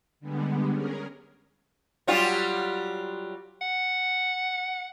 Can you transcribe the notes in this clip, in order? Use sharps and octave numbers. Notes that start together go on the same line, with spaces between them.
D3 G3 G#3 B3
C#4 G#4 A#4
F#3 G3 F4
F#5